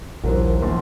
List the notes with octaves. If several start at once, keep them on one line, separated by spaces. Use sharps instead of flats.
D#1 A#1 F3 E4 A#4 C5
A#1 E2 C6